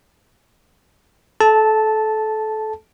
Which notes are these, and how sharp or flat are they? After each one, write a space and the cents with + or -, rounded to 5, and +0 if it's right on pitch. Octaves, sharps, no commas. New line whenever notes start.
A4 -25 A5 -5